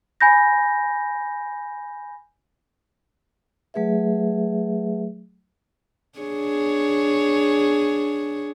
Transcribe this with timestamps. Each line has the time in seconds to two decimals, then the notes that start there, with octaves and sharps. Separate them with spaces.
0.21 G#5 B5 G6 A#6
3.74 F#3 A3 G#4 B4 E5
6.19 D4 G#4 C#5